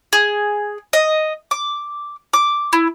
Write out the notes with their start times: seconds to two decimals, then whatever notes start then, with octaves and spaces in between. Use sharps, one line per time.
0.13 G#4
0.93 D#5
1.51 D6
2.33 D6
2.73 E4